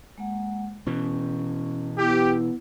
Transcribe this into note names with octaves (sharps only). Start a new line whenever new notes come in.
G#3 A#3 F#5
B2 E3 C#4
B3 E4 G4